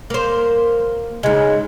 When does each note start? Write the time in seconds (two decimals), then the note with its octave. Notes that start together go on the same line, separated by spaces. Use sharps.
0.10 A#3 C5
1.23 G#2 C#3 G#3